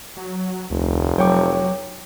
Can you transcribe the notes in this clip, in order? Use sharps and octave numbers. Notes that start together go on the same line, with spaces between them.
F#3
F1 D2
F#3 C#5 G5 D6